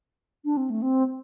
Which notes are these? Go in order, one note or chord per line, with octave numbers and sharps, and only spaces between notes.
D4
C4
A3
C4